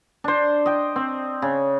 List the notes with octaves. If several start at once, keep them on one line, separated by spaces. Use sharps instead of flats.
D4 C5
D#5 G5
C4
C#3